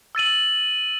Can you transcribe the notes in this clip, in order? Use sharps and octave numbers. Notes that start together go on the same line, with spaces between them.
E6 A6 D#7 F#7